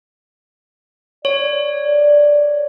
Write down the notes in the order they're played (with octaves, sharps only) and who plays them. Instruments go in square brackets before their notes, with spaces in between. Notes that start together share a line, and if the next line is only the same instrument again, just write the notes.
[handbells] C#5 [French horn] D5